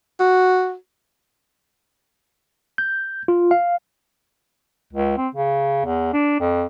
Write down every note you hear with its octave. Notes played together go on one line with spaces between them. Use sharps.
F#4
G6
F4
F5
C#2
C4
C#3
E2
D4
F2